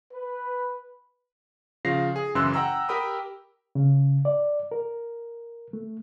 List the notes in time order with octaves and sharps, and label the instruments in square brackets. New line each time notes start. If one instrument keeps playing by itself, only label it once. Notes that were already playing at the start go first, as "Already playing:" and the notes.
[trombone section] B4
[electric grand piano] C#3 F3 F5 A#6 C7
G#4
F#2 C#3 E3 C6 E6 F#6
F#5 G5 A#5 E6
G4 A#4 G5 B5 D#6
[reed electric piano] C#3
D5
A#4
A3